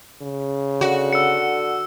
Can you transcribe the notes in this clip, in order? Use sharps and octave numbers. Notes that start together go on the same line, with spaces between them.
C#3
D3 F#4
D3 E6 C#7